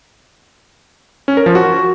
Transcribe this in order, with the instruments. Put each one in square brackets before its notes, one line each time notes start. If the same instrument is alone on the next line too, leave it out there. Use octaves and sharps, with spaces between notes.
[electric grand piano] C#4
A#4
F3
F#4